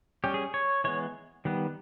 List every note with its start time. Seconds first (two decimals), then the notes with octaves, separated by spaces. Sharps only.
0.24 G3 C#4 G4
0.34 G#4
0.54 C#5
0.84 E3 G#3 B3 C#5
1.45 D#3 G3 B3